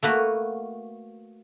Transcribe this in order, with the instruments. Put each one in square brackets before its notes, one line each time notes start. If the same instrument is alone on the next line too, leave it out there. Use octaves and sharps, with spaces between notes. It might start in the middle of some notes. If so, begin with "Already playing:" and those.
[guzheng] A3 A#3 F#4 B4